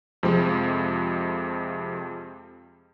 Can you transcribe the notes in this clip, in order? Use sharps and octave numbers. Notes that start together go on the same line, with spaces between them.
F2 C3 F3 G#3 C4